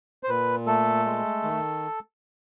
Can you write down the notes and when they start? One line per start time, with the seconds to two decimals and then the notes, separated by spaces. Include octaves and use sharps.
0.23 C5
0.28 A#2 B4
0.67 A3 A4
1.06 G#3
1.43 D#3